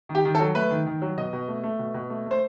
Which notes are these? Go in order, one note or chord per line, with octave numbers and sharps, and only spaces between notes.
D#3
G4
D#3
A4
F#3
A3 B4
D#3
D#3
F#3
B2 D#5
B2
A3
A3
B2
B2
A3
A3 C5